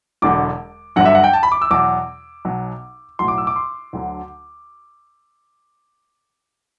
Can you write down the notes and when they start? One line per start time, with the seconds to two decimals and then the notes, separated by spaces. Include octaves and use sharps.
0.22 E1 E2 D3 F#3 D6
0.96 G1 G2 D3 F#3 F#5
1.05 E5
1.15 F#5
1.24 G5
1.33 A5
1.43 B5
1.52 D6
1.62 E6
1.70 E2 B2 F#3 D6
2.45 B1 B2 F#3
3.19 B1 A2 F#3 C6
3.28 D6
3.38 E6
3.47 D6
3.56 C6
3.93 D2 D3 F#3